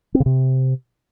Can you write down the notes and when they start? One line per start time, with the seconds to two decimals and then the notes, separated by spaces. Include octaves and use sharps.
0.15 C4
0.20 C#3
0.26 C3